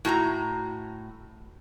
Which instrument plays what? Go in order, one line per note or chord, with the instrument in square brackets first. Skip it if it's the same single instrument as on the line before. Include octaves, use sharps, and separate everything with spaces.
[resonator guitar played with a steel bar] A2 F#4 A5 A#5